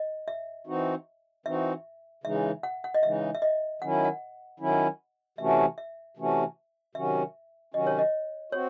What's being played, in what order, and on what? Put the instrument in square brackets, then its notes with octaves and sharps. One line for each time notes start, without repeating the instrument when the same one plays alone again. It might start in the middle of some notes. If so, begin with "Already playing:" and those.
Already playing: [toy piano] D#5
E5
[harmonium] E3 C4 D#4 F#4
[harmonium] E3 C4 D#4 F#4 [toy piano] E5
[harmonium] C#3 E3 G#3 D#4 [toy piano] E5
[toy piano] F#5
F#5
D#5
[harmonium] C#3 E3 G#3 D#4 [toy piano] E5
[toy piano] E5
D#5
[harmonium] D#3 F#3 C#4 E4 [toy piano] F#5
[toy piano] F#5
[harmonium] D#3 F#3 C#4 E4
[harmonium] C3 E3 A3 C#4 F#4 [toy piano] E5
[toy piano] E5
[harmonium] C3 E3 A3 C#4 F#4
[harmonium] C3 D#3 F#3 C#4 F#4 [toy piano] E5
[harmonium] C3 D#3 F#3 C#4 F#4 [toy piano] D#5
[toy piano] C#5
D#5
[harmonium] C4 F#4 [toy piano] C#5